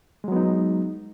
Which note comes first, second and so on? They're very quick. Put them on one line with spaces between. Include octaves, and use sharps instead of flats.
G#3 F#3 B3 D#4